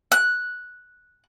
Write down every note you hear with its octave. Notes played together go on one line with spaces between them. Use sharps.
F#6